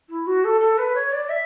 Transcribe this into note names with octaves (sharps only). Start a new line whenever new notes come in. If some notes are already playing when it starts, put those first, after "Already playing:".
E4
F#4
A4
A4
B4
C#5
D5
E5